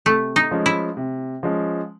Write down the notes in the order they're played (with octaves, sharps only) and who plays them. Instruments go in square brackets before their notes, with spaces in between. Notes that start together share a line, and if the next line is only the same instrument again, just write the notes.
[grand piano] C3 [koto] A3
[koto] D#4
[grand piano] F3 G#3 C#4
[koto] E4
[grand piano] C3
F3 G#3 C#4